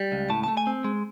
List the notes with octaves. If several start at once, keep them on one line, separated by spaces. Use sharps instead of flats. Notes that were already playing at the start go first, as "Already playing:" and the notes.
Already playing: G3
C#2
A2 A5
A3 A5
G#5
C4
G#3